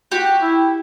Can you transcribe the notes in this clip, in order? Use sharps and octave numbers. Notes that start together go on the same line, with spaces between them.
F#4 G4
E4